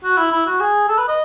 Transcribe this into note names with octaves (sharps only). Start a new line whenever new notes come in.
F#4
E4
E4
F#4
G#4
A4
B4
D#5